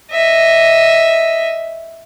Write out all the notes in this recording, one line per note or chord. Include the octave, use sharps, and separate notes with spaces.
D#5 E5